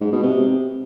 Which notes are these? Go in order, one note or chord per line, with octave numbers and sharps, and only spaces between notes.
G#2
B2
C3